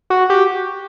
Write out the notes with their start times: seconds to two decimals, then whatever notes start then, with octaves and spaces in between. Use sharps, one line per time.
0.10 F#4
0.30 G4